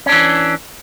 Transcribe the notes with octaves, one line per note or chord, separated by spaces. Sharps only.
E3 C#4 D4